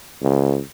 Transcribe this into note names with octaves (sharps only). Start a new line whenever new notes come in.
C#2